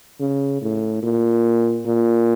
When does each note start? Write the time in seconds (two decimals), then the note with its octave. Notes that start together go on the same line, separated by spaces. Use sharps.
0.20 C#3
0.62 A2
1.03 A#2
1.86 A#2